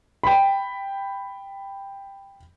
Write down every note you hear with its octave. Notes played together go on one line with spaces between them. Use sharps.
G5 B5